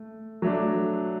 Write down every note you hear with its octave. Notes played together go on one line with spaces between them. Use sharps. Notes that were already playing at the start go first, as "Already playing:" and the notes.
Already playing: A3
F#3 A3 D4